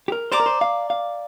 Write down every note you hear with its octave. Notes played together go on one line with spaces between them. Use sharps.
G4
A#4
C5 D5 A#5 D6
A#4
C5
F5
F5